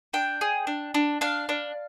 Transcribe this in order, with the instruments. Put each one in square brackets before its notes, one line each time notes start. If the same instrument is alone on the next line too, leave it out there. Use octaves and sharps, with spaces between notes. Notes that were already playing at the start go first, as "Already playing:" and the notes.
[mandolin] D4 G5
G#4
D4
D4
D4 F5
D4